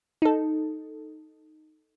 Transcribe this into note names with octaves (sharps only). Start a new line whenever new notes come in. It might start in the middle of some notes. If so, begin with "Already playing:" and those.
D#4 A4